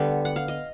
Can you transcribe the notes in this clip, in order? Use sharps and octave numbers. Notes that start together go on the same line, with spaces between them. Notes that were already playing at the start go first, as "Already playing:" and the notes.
Already playing: D3 G3 B3
F#5
F5
D#5